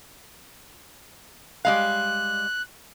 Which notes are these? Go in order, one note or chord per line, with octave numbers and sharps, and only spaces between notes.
G3 G#3 F5 F#6